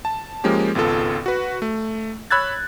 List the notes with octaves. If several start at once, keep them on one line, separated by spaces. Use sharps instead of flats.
A5
F3 G#3 A#3 C#4 G4
G#1 C#2 B3 F4 A4
F#4 B4
A3
C#5 B5 E6 F#6 G#6 A6